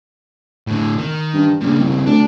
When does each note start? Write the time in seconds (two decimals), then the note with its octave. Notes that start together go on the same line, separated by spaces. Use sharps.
0.67 A2 D3
0.98 D#3
1.34 G2
1.61 A#1 G2 C#3
1.80 C2
2.06 D2 D4